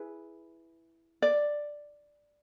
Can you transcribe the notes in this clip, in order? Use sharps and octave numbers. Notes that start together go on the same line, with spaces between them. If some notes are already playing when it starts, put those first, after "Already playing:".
Already playing: E4 G#4 B4
D5